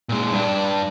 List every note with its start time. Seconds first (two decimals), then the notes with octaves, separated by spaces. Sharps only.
0.09 A#2 G#3
0.32 G2 D4